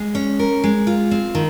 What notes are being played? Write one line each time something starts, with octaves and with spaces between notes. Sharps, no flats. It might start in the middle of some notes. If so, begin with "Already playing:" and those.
Already playing: G#3
C#4
A#4
G#3
F4
C4
D#3